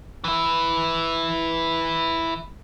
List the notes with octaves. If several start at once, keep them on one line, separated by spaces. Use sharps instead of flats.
E3 E4